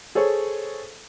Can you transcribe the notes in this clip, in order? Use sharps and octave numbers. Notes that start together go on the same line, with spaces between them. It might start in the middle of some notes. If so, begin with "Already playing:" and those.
G#4 A4 C5 C#5